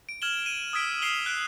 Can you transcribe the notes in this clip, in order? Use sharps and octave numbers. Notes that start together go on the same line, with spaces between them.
D7
F6 G#6 E7 F#7 G7
D#7
D#6 E6 G#6 B6 D7 G7
F6 C7 D7 E7 F7 G7
F#6 D7